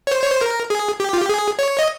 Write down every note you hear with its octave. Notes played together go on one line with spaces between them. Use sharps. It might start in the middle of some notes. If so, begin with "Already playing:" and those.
C#5
C5
C#5
C5
A#4
G#4
G4
F4
G4
G#4
C#5
D#5